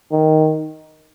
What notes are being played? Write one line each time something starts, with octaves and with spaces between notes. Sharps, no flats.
D#3